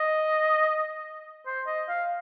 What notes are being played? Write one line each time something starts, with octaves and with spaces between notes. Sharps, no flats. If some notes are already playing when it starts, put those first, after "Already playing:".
Already playing: D#5
C5
D#5
F5